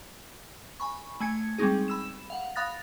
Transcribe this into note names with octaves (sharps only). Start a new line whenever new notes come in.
G#5 B5 C#6
A3 G#5 G#6 C#7
G3 G#3 C4 C#4 D#4 G#4
B5 E6 E7
F5 F#5
F5 B5 D#6 F#6 A6 A#6